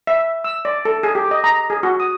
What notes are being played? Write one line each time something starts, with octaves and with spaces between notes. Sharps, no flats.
E5
E6
D5
A4
G#4
G4
D#5
A#5
G#4
F#4
D#6